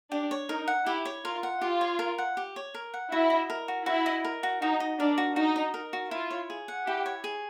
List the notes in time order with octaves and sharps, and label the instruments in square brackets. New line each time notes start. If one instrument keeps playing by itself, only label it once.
[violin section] D4 [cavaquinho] G4
[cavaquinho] C#5
[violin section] D#4 [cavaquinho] A#4
[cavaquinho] F#5
[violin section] E4 [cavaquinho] G4
[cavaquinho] C#5
[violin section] F4 [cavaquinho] A#4
[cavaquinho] F#5
[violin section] F4 [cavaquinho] G4
[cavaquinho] C#5
A#4
F#5
G4
C#5
A#4
F#5
[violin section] E4 [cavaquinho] F#4
[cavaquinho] D#5
A#4
F#4
[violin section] E4 [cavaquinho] F#4
[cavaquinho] D#5
A#4
F#4
[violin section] D#4 [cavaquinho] F#4
[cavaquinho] D#5
[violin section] D4 [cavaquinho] A#4
[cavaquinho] F#4
[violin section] D#4 [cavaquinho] F#4
[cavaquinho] D#5
A#4
F#4
[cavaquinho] E4 [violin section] F4
[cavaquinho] C#5
G#4
F#5
[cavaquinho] E4 [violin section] G4
[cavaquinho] C#5
G#4